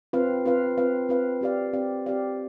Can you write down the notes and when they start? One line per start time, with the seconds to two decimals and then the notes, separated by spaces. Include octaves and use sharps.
0.13 C4 F4 B4 F5
0.45 C4 F4 B4 F5
0.77 C4 F4 B4 F5
1.09 C4 F4 B4 F5
1.41 C4 G4 D5 F5
1.73 C4 G4 D5 F5
2.06 C4 G4 D5 F5